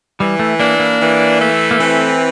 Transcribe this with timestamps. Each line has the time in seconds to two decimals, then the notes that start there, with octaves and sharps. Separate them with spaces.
0.20 E3 G3
0.39 A3
0.59 A#3 D4
0.79 A#3
0.99 E3
1.40 A3
1.71 A#3
1.80 E3 C4